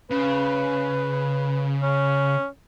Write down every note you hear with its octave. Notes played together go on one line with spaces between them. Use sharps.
C#3 B4
C#4